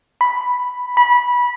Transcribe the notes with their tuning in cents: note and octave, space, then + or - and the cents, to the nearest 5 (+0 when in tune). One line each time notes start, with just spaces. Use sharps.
B5 +0
B5 -20